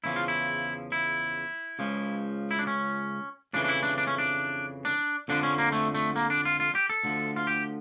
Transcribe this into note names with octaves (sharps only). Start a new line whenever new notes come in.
E2 C#3 F3 E4
F4
E4
E4
C#2 C#3 F3
E4
D4
C#4
F2 C#3 E3 D4
D4
E4
D4
D4
C#4
D4
D4
F2 D3 F3 D4
C#4
A#3
A3
A3
A#3
D4
F4
F4
G4
A4
D2 D3 F3
F4
G4